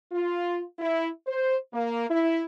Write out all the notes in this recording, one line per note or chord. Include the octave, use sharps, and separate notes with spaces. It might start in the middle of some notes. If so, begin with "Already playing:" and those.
F4
E4
C5
A#3
E4